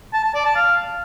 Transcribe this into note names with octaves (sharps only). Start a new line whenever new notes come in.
A5
A5
D5
A5
F5